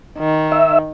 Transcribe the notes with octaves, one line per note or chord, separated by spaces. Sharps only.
D#3
E5